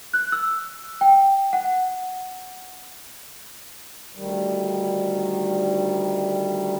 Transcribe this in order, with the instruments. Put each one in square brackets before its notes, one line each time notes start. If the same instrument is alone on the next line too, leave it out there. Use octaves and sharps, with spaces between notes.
[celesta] F#6
E6
G5
F#5
[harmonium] D2 D#3 G3